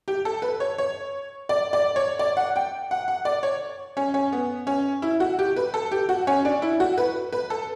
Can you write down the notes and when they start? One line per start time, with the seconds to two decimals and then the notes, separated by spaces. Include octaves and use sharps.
0.08 G4
0.25 A4
0.42 B4
0.60 C#5
0.78 C#5
1.49 D5
1.73 D5
1.96 C#5
2.19 D5
2.37 F#5
2.56 G5
2.91 F#5
3.08 F#5
3.25 D5
3.43 C#5
3.97 C#4
4.14 C#4
4.32 B3
4.67 C#4
5.02 E4
5.20 F#4
5.39 G4
5.56 B4
5.74 A4
5.92 G4
6.09 F#4
6.27 C#4
6.45 D4
6.62 E4
6.80 F#4
6.98 B4
7.32 B4
7.50 A4